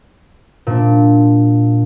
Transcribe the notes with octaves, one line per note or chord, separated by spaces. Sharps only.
A#2 D4